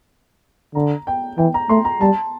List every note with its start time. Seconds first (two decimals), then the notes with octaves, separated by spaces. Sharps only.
0.75 D3 A#5
1.07 G5
1.38 E3 G5
1.54 A#5
1.69 A3 C6
1.85 A#5
2.01 G3 A5